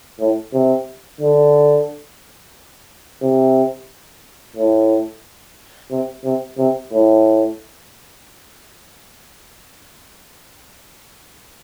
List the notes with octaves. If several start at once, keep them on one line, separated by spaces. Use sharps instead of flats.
A2
C3
D3
C3
A2
C3
C3
C3
A2